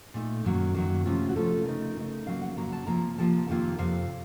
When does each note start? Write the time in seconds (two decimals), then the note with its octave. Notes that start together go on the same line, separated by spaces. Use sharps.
0.14 A#2 A3 D#4
0.44 F#2 D#3 F#3 A#3
0.74 F#2 D#3 F#3 A#3
1.05 C3 F3 A3 C#4 F4
1.29 F#4
1.36 C3 F3 A3 C#4 F4 A4
1.65 C#3 A3 D#4 A#4
1.97 C#3 A3 D#4
2.26 F2 C#3 F#3 A#3 F5
2.42 F#5
2.57 F2 C#3 F#3 A#3 A#5
2.73 A5
2.87 C3 F3 A#3 A#5
3.18 C3 F3 A#3 A5
3.48 F2 C3 D#3 A#3 F4
3.78 F2 C3 F5